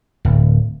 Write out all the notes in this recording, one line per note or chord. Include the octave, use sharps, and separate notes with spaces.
D1